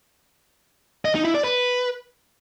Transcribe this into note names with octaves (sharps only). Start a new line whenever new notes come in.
D#5
D#4
E4
D5
B4